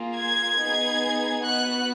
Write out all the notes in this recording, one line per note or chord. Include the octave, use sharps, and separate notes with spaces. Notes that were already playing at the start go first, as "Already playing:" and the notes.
Already playing: A#3 F4 G#4
G#6
B3 D#4 G#4
B3 F#4 F#6